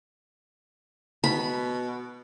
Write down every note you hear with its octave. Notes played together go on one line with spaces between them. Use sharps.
B2 B5